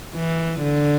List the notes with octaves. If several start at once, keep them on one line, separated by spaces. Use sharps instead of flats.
E3
D3